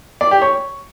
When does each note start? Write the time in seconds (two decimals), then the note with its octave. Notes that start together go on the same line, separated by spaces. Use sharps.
0.21 D5
0.31 G4
0.42 C#5